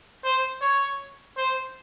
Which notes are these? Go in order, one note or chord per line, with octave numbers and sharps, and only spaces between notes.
C5
C#5
C5